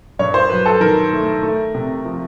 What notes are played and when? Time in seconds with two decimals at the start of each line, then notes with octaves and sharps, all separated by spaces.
0.19 G2 C#5
0.34 C5
0.50 F#3 B4
0.66 A4
0.80 D#3 A#4
1.13 A3
1.43 A3
1.74 C3
2.05 F3